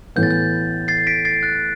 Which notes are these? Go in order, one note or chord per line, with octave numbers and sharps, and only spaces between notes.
A2 E3 B3 G6
A6
G6
A6 C7
B6 D7
A6 C7
F#6 A6